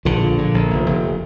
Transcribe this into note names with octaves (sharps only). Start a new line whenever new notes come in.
A#1 D3 F3
A#2
A#2
A#1
F1
F1